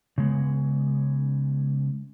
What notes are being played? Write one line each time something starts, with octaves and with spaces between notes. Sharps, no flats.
C#3 G#3 B3